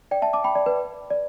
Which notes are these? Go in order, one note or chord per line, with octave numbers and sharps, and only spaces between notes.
D5 G5
E5 A5
A5 D6
G5 B5
D5
B4
D5